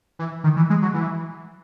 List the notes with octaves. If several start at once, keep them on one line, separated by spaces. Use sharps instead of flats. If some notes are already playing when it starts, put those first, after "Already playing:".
E3
D#3
E3
G#3
F#3
E3